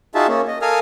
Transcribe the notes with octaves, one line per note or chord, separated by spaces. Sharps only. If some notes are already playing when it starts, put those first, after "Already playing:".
D#4 F4 F#4 G#4 E5 A5
A#3 C#4
D#5
A4 A#4 F5 G#5 D#6 F6